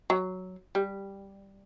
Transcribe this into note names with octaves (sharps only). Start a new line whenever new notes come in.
F#3
G3